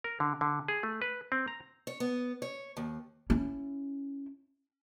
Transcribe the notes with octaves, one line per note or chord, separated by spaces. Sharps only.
A#4
D3
D3
G#4
A3
B4
C4
A#5
C#5
B3
C#5
D#2
C#4 E4